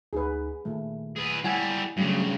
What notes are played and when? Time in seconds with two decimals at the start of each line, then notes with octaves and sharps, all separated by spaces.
0.13 D2 D#4 G#4 B4
0.65 A#2 D#3 A3
1.16 G#4 B4
1.44 G3 E4 A4 F#5 G#5
1.97 G2 C#3 F#3 A3